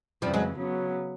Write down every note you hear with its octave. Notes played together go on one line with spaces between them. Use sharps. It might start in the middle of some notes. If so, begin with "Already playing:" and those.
F2 C#3 E3 F3 G3
F#3 G#3
C#3 F#3 B3